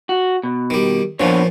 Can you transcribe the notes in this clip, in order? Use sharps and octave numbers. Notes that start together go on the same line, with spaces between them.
F#4
B2
D#3 G3
A#2 F3 B3 D4 C#5